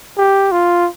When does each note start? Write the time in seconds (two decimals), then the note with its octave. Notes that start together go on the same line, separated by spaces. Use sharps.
0.17 G4
0.51 F4